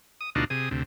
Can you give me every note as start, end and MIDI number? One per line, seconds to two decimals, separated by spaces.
0.21 0.30 87
0.35 0.44 38
0.35 0.44 47
0.35 0.44 62
0.35 0.44 63
0.35 0.44 65
0.35 0.44 66
0.50 0.69 48
0.50 0.69 68
0.50 0.69 87
0.71 0.83 38
0.71 0.83 48